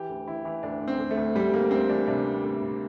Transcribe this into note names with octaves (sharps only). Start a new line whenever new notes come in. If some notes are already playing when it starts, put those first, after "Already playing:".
Already playing: E3 G4
D2
E3 E4
E3
D2 D4
D2
C4
D2
A3
D2
D2 G3
D2 A#3
D2 C4
E3 D4
C3 D4
C3
D2
C3